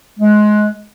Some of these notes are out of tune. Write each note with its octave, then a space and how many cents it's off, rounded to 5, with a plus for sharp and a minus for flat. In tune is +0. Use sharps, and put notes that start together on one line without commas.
G#3 +20